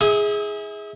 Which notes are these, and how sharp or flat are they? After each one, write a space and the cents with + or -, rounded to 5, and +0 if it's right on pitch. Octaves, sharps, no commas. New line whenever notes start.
E4 -30 G#4 +0 D#6 +20